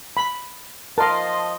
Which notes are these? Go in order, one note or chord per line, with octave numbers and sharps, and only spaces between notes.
B5
F3 A#4 D#5 A5 C6